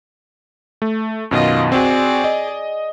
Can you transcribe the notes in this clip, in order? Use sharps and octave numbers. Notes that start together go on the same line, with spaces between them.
A3
F#2 B2 D#3 F4 D#5
C4 F#4 G#4 D5
D#5